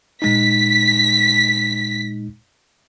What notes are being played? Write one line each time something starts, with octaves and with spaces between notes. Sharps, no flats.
A#2 G#3 D#4 B6